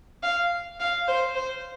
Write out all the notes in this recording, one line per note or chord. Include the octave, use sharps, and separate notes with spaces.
F5
F5
C5
C5